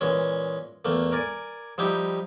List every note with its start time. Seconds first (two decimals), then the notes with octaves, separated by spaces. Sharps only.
0.01 A#2 E3 G#3 C#4
0.85 E2 A3 A#3
1.12 A#4 D5 G#5
1.78 F3 G3 D#4 E4 G4